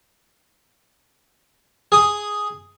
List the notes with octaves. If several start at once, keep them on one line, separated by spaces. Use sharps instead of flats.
G#4 D#6